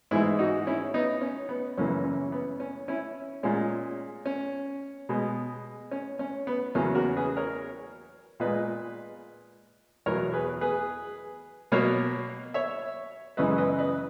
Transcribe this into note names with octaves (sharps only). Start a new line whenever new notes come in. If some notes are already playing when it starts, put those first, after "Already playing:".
G#2 E3 G#3 E4 G#4
D#4 F#4
C#4 E4
B3 D#4
C#4
B3
F#2 C#3 E3 A#3 C#4
C#4
B3
C#4
C#4 E4
A#2 G#3 C#4
C#4
B2 G#3
C#4
C#4
B3
E2 C#3 F#3 A#3 C#4
F#4 A#4
G#4 B4
A#4 C#5
A#2 G#3 B4 D#5
E2 B2 F#3 A#4 C#5
G#4 B4
G#4 B4
B2 F#3 A#3 A#4 C#5
C#5 E5
F#2 C#3 E3 G#3 B4 D#5
B4 D#5
B4 D#5